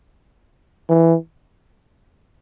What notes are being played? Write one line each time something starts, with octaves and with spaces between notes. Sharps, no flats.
E3